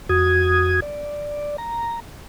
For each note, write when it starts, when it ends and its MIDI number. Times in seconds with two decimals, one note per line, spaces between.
0.09 0.80 41
0.09 0.80 66
0.09 0.80 87
0.09 0.80 92
0.82 1.57 74
1.58 2.00 82